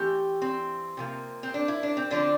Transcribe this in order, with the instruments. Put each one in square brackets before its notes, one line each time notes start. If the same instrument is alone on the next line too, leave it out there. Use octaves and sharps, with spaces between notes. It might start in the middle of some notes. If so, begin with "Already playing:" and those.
Already playing: [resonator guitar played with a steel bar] E3 A3 C4 G4
C4
C3 F3 A#3
C4
D4
E4
D4
C4
D3 F3 C4 D4